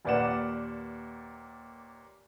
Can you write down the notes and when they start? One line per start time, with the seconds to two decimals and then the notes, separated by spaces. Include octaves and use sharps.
0.05 D#2 A#2 B4 D5 F#5 E7